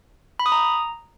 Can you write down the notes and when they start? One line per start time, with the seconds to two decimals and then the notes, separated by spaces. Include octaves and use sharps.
0.39 B5
0.46 D#6
0.52 A#5